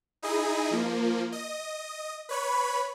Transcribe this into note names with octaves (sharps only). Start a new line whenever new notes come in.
D#4 E4 G#4 D#5
F3 A#3
D#5
B4 C#5 B5